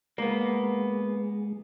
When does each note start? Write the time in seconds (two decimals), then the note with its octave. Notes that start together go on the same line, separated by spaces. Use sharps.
0.18 G#3 A#3 B3